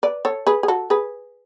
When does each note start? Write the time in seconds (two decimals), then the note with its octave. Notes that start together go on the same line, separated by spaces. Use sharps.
0.03 B4 D5
0.25 A4 C#5
0.47 G#4 B4
0.63 G#4
0.68 F#4 A4
0.90 G#4 B4